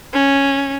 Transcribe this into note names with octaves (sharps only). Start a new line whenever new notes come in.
C#4